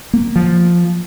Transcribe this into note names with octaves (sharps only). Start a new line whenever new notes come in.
A#3
F3